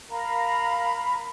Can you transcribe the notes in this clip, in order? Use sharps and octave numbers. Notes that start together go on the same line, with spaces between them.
A#4 F5 A#5 B5